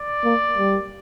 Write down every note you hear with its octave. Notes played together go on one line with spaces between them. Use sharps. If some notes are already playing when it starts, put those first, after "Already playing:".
Already playing: D5
A#3
G3